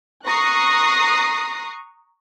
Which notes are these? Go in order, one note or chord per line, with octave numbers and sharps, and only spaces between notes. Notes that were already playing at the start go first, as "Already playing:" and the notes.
A#5 C#6 D#6 F#6 A#6 C7